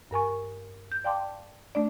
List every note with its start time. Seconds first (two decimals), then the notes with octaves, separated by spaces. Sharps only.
0.11 G2 A#4 G#5 C#6
0.92 G6
1.04 D5 F5 G5 A5 C6 D6
1.75 A3 D4 D5